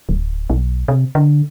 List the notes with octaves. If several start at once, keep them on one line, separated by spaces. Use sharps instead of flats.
D1
B1
C3
D3